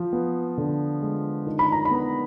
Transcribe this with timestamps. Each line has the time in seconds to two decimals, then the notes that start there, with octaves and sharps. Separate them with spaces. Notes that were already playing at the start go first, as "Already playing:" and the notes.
Already playing: F3
0.13 B3
0.58 D3
1.02 G#3
1.46 D#3
1.59 B5
1.72 A#5
1.85 B5
1.91 B3